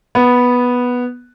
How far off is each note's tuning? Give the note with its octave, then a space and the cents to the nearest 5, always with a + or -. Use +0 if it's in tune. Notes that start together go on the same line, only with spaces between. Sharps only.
B3 -5